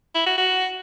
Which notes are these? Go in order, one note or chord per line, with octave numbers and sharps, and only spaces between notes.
E4
F#4
F#4